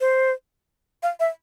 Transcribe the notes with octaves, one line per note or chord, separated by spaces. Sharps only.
C5
F5
E5